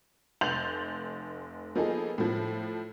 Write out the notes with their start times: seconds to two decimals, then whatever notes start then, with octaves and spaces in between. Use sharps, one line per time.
0.41 F1 C6 G6 A6 F7 F#7
1.75 F3 A#3 B3 D#4 G#4 A4
2.18 A2 F3